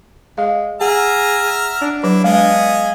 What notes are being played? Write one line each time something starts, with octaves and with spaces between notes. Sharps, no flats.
G#3 F5
G#4 E5 F#5 A#5 F6
D4
F#3 E4 B4
G#3 B3 G#4 D#5 F5